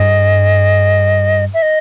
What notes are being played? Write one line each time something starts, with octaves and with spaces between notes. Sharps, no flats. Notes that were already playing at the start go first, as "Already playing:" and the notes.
Already playing: G2 D#5
E5
D#5